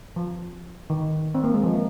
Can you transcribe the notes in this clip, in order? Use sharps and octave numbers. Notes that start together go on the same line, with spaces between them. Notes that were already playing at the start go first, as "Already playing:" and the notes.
F3
D#3
C4
A#3
G#3
F3
A#3